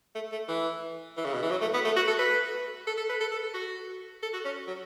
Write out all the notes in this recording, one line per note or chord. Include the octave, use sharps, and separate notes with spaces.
A3
A3
E3
E3
C#3
B2
E3
F#3
A3
B3
A3
F#4
A4
B4
A4
A4
B4
A4
A4
A4
F#4
A4
F#4
C#4
F#3